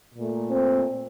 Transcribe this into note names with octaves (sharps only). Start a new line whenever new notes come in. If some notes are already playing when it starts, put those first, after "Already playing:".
A#2 A3
C4